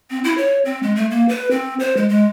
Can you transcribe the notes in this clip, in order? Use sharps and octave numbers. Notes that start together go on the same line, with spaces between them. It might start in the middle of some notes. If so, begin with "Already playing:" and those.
C4
E4
C#5
C4
G#3
A3
A#3
B4
C4
C5
G#3
G#3